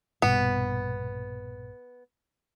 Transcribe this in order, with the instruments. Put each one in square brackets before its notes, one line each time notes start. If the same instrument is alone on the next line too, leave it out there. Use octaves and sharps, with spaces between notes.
[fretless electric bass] A#1 G2 B2 [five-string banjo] B3